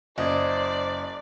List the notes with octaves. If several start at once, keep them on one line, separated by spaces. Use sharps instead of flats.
F#1 C5 D5 D#5 D#6 G#6